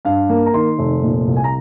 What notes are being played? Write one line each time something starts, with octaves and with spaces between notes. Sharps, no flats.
G2 F5
A#3
A#5
D#3 C6
F1
A#2
C2
G#5
A#5